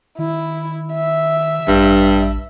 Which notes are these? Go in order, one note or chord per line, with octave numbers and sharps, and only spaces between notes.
D#3 E4
E5
A1 G2